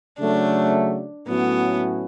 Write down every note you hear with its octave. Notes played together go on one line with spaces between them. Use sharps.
C#3 F#3 A3 D4
A2 F#3 A3 B3 C#4 F#4